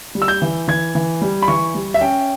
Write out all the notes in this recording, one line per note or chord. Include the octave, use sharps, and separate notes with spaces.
G3
E6
G6
E3
E3 G#6
E3
G3
B5
E3 C#6
G3
E5
C#4 G5